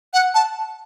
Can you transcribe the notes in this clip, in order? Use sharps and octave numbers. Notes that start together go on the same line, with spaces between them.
F#5
A5